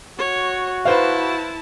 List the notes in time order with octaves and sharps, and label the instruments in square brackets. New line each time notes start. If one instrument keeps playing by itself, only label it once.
[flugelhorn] F#4 [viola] C#5
[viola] E4 A5 [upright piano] B4 C5 F5